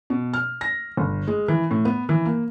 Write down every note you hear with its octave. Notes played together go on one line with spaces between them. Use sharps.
B2
F6
A#6
G1
G#3
E3
A2
B3
E3
A#3